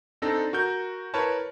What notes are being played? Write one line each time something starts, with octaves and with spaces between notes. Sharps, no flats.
C4 D4 D#4 A4 A#6
F#4 A#4 G6
E4 A#4 B4 C#5 A5